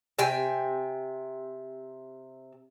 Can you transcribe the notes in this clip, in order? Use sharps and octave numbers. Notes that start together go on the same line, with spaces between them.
C3 G5 G#5